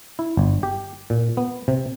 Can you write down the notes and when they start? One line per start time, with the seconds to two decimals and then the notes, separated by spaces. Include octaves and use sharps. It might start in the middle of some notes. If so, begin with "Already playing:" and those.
0.19 E4
0.37 G1
0.63 G4
1.10 A#2
1.37 B3
1.68 C3